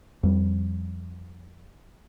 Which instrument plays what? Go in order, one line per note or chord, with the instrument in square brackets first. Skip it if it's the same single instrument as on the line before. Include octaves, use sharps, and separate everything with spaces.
[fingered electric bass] F2 G3